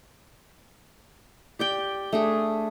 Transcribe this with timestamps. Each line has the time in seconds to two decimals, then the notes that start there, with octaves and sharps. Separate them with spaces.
1.59 G4 D5 G5
2.12 A3 D4 G#4